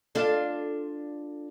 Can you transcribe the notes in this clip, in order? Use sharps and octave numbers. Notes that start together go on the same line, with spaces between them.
D4 F4 A4